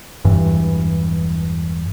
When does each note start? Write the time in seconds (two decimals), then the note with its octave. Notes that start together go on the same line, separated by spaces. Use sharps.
0.24 E1 G2 E3